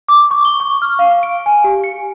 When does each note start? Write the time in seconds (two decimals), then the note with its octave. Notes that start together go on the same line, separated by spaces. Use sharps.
0.08 D6
0.31 C#6
0.45 G7
0.60 C#6
0.82 F6
0.99 F5
1.23 D7
1.46 G#5
1.64 G4
1.84 C#7